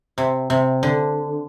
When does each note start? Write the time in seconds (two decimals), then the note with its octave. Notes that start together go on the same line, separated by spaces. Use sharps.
0.18 C3
0.50 C3
0.83 D3